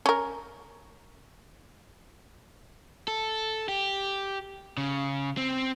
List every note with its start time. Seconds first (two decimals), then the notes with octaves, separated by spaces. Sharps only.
0.06 C#4 A#4
3.08 A4
3.69 G4
4.77 C#3
5.37 C4